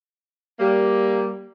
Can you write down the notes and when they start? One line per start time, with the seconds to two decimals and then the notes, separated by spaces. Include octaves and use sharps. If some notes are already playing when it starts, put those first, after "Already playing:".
0.60 G3 A#3